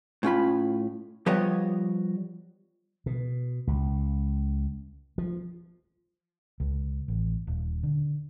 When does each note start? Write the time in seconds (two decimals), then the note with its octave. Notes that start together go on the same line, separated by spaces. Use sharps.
0.23 A2 C#4 F4 B5
1.26 F3 G3 B3 G4 C#5 D#5
3.06 B2
3.67 C#2
5.18 F3
6.60 C#2
7.08 A1
7.47 D#1
7.83 D3